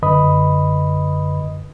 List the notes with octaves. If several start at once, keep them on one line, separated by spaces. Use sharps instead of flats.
F#2 D3 B4 D#5 B5 D#6